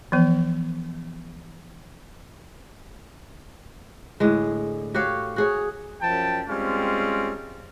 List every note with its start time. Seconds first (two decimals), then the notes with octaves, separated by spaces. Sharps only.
0.12 E3 F3 B3
4.20 A2 D3 G#3
4.94 F#4 G4 C#5 F5
5.36 F#4 G#4 C#5
6.01 F#2 F3 G5 A5
6.49 G3 G#3 C4 C#4 F4